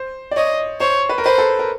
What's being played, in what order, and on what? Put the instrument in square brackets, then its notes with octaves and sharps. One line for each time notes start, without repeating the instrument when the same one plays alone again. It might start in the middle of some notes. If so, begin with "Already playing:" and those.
Already playing: [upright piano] C5
D5
[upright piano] C#5 [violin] D#5
[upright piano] C5 [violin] C#5
[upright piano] B4
A#4
[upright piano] B4 [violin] C5
[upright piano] A4
A#4